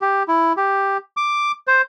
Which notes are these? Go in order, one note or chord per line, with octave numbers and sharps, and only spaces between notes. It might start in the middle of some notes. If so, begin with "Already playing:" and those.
G4
E4
G4
D6
C5